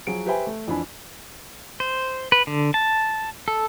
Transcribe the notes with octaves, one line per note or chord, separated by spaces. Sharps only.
F3 F#3 G#4 D7
G4 B4 C5 E5 G5 G#5
A3
F2 E3 D4 G#5 B5
C5
B4
D3
A5
A4